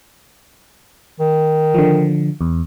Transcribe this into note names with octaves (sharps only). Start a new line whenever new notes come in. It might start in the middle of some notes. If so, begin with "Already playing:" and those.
D#3
D3 F3
E2